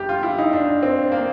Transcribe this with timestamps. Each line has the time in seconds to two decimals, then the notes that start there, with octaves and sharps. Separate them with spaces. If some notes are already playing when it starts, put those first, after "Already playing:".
Already playing: F#1 G4
0.09 F4
0.23 E4
0.38 D#4
0.53 D4
0.83 C4
1.12 A#3